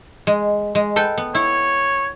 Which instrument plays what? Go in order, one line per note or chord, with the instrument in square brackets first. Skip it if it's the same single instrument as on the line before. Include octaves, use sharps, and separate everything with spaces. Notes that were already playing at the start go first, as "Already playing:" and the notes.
[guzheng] G#3
G#3
A4 B4 G5
B3
[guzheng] E4 [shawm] C#5